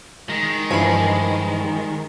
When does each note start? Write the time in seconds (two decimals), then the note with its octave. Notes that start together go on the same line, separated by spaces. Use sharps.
0.29 D#3 G#3
0.70 G2 E3 F3 G#5 B5